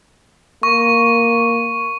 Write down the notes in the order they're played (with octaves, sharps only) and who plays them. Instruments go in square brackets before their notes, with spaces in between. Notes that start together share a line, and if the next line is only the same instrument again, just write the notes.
[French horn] A#3 [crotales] C#6